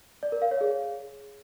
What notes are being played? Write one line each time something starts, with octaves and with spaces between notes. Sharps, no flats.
D5
A#4
F5
C#5
G#4